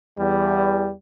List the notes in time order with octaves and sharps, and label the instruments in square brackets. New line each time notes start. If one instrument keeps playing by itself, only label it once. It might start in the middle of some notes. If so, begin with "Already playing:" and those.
[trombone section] E2 G3